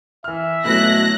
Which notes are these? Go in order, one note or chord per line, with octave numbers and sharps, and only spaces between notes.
E3 E5 F6
B2 F#3 A3 B3 E4 F#6 A#6